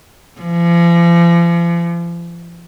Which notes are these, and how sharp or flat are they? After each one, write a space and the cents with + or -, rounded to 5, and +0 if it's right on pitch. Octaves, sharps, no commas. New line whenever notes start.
F3 -40